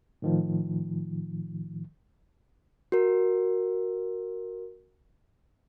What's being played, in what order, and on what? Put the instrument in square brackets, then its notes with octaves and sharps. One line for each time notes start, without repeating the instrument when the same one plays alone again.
[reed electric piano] A2 D#3 F3
[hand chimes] F#4 A#4